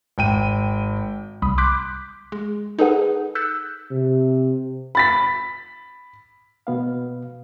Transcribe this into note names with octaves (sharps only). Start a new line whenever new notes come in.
G#1 G5 D#7
C2 B5 D#6
C6 D6 F#6 G6 B6
G#3
D#4 G#4 A4 B4 F#5 D#6
E6 F#6 G6 A6 B6 C#7
C3
B5 A6 B6
B2 B3 F5